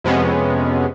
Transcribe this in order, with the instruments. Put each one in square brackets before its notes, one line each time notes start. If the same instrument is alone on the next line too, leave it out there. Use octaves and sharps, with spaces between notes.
[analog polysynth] F2 C3 G#3 B3 C#4